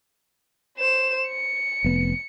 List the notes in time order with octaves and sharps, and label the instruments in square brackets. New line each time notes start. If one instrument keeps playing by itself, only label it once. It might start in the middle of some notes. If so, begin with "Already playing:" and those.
[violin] C5 E7
C#7
[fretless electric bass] F1 B3